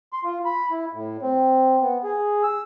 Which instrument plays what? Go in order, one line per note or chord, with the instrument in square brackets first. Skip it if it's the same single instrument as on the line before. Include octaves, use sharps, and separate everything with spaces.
[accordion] C6
F4
B5
E4
A2
C4
B3
G#4
E6